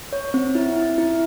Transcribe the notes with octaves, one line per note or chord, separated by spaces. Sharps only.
C#5
C4
E4
E4
E4